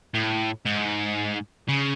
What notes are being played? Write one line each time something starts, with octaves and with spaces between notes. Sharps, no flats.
A2
G#2
C#3